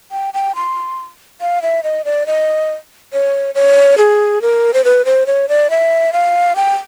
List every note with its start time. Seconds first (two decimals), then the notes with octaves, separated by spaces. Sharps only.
0.12 G5
0.34 G5
0.55 C6
1.41 F5
1.62 E5
1.83 D#5
2.05 D5
2.27 D#5
3.13 C#5
3.55 C#5
3.98 G#4
4.42 A#4
4.74 C5
4.84 B4
5.05 C5
5.27 C#5
5.49 D5
5.70 E5
6.13 F5
6.56 G5